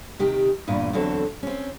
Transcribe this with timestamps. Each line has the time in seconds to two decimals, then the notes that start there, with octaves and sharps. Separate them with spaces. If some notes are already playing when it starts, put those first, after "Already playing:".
0.19 C3 D#3 G4
0.68 E2 G2 A#2 E3
0.93 E2 D3 F#3 C4 A4
1.43 C4 C#4